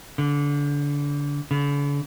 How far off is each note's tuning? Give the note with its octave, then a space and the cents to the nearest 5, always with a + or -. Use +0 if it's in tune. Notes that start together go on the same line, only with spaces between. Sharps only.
D3 -25
D3 -45